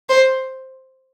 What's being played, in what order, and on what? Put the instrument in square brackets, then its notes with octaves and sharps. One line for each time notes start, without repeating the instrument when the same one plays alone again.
[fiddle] C5